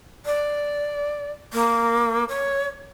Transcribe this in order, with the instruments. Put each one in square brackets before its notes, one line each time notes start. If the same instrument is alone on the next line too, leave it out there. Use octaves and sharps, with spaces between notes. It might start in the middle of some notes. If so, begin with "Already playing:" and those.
[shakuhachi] D5
A#3
C#5